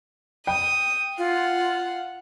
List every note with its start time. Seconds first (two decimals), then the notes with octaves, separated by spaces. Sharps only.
0.47 G5 D#6
1.18 F4 F5 F#5